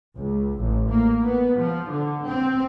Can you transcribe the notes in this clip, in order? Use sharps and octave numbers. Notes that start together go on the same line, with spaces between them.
C#2
A1
A#3
B3
F3
D3
C4